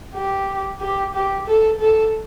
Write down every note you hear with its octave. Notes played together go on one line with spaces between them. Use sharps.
G4
G4
G4
A4
A4